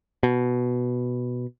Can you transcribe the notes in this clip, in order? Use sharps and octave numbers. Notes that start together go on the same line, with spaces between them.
B2